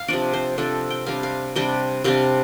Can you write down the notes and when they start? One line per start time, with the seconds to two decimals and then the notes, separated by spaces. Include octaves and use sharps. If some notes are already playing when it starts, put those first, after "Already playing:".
Already playing: F5
0.08 C3 F3 D4 D5
0.33 C5
0.57 C3 F3 D4 A4
0.90 G5
1.06 C3 G3 D4 F5
1.23 F5
1.56 C3 G3 D4 G5
2.04 C3 G3 D4 F5